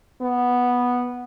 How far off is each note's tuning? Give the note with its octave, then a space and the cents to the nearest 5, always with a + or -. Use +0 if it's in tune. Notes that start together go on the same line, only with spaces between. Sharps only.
B3 -5